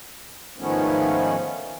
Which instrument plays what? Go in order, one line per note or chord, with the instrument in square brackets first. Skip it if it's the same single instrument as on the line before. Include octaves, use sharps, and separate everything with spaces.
[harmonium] G#2 D#3 F3 A3 B3 C#4